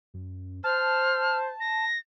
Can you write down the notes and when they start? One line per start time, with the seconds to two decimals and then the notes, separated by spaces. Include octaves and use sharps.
0.14 F#2
0.64 C5 A5 F6
1.60 A#6